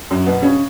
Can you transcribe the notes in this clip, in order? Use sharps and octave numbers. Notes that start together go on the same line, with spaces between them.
F#2 F#3
B2 B3
C#3 C#4